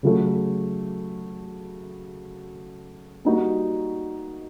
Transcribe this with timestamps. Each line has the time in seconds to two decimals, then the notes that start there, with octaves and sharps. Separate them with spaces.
0.03 C#3 F#3 A3
3.25 G3 A#3 D#4 F#4